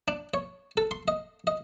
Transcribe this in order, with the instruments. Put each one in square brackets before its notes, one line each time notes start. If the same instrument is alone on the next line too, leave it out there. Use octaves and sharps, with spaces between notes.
[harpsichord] D4
C#5
A4
C6
D#5
D#5